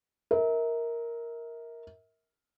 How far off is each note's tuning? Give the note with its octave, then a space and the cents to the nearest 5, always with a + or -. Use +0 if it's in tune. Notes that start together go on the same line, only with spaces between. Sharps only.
A#4 +0 E5 -40